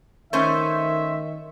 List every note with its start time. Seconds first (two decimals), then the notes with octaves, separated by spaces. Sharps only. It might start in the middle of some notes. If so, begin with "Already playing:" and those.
0.33 D#3 A3 C#4 C5 E5